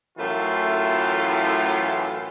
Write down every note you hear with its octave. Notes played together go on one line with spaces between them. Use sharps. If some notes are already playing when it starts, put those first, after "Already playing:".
F#2 A2 E3 A3 F4